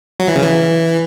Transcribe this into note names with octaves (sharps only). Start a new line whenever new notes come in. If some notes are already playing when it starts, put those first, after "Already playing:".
F#3
E3
C#3
E3